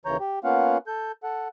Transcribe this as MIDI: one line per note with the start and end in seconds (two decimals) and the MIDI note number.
0.06 0.17 39
0.06 0.17 49
0.06 0.17 52
0.06 0.17 73
0.06 0.17 82
0.06 0.17 91
0.20 0.39 67
0.44 0.78 58
0.44 0.78 59
0.44 0.78 61
0.44 0.78 65
0.44 0.78 77
0.44 0.78 78
0.87 1.12 69
0.87 1.12 91
1.23 1.48 69
1.23 1.48 78